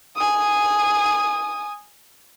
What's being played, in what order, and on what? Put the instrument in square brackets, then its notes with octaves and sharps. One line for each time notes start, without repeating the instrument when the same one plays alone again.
[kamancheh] G#5 D#6